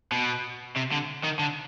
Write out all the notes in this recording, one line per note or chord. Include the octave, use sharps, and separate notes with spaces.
B2
C3
D3
D#3
D3